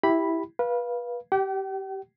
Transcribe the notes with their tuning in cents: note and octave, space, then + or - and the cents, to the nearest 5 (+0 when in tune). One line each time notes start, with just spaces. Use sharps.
E4 -5 G4 +0 B5 +0
B4 -25 F5 +0
G4 -15 G5 -45